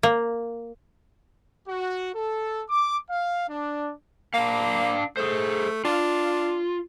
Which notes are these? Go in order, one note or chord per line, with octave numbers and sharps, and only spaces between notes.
A#3
F#4
A4
D6
F5
D4
A#3 D4 F5
A3 G#4 C5
D4 F4